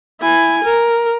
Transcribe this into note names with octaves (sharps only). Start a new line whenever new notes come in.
E4 G#5
A#4